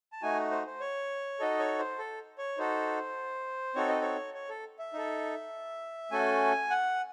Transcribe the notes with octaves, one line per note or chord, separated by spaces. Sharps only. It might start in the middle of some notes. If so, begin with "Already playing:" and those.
A5
A3 D#4 F#4 G#5
C5
C5
C#5
D#4 F#4 A4 D#5
C#5
C5
A4
C#5
D#4 F#4 A4 C5
C4 D#4 F#4 A4 C#5
D#5
C#5
C#5
A4
E5
D#4 A4
A3 C#4 F#4 A4 G#5
F#5